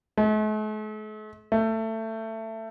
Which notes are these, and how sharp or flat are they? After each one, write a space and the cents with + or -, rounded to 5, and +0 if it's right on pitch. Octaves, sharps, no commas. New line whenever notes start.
A3 -45
A3 +20